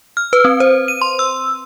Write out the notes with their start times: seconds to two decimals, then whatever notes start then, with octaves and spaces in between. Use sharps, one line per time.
0.17 F6
0.33 B4
0.45 C4
0.60 C5
0.88 D#7
1.01 C6
1.19 E6